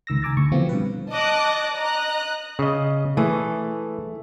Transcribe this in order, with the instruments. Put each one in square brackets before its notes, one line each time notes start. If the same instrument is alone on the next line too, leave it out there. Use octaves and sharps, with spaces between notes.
[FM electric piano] C#2 D#3 E6 A#6
G#5 A#5 D6 E6 A6 A#6
D2 C#6
B2 E3 F3 A3 C4 F4
G2 B4
[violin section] D#5 A5 D6 F#6
D#5 A#5 F#6
[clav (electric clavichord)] C#3 D#5
[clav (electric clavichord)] E3 G#4 [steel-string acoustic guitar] A3